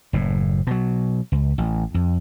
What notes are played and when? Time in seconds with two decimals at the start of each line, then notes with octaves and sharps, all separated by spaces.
0.13 F#1 A2
0.67 B2 F#3
1.32 C#2
1.58 A1
1.94 F2